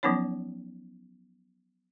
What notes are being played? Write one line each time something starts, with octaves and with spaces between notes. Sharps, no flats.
F3 F#3 B3 C#4 D#4 C#5